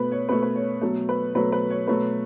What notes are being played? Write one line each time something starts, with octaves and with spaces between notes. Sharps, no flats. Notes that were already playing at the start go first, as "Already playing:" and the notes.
Already playing: B2 A3 B4
C#5
B2 A3 B4
B4
C#5
B2 F#3 A3 A4
B4
B2 F#3 A3 B4
B4
C#5
B2 F#3 A3 B4